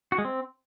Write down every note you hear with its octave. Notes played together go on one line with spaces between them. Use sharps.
F#4
G#3
C4